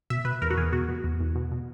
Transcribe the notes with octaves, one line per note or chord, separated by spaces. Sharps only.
B2 E5
B2 B4
E2 A#4
F#4
E2 G#4
B2 F#4
B2
E2
E2
B2
B2